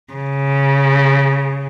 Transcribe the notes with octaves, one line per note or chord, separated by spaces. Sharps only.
C#3